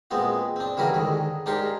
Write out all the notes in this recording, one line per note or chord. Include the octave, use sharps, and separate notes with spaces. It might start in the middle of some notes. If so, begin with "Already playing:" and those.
A#2 G#3 B3 C4 F#4
C4 D4
C#3 E3 G3 E4 F#4 A#4
G#2 D3 D#3
G#2 D4 G4 A#4 C6 C#6